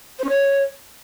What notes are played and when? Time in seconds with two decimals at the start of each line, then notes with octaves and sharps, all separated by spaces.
0.19 C5
0.24 C#4
0.29 C#5